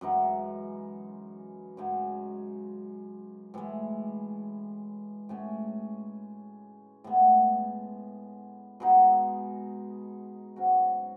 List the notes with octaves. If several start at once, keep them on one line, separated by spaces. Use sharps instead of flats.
F#2 E3 G#3 D#4
F#2 C#3 G#3 D#4
A2 E3 G#3
A2 G#3 C#4
A2 G#3 B3
B2 G#3 D#4
G#2 F#3 C#4 F#4